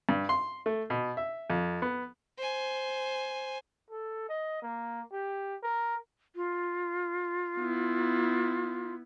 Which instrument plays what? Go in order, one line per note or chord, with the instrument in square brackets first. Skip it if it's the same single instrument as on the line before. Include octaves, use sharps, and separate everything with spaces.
[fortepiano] G2
C6
A3
B2
E5
F2
B3
[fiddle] C5 G#5
[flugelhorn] A4
D#5
A#3
G4
A#4
[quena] F4
[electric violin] B3 E4